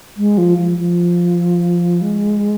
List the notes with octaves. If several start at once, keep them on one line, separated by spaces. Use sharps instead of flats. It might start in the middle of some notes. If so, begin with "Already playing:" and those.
G#3
F3
F3
F3
G#3